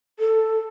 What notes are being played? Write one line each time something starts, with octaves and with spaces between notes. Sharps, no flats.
A4